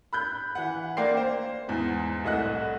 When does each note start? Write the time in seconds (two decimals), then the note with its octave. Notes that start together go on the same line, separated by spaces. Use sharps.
0.13 B5 F#6 G6
0.55 E3 F#5
0.97 A#3 D5 F5 G5 C6 C7
1.17 C5
1.68 E2 G#2
2.24 C2 A2 D#5 F#5 F#6